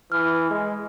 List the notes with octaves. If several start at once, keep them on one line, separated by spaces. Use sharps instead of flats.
E3 F6
G#3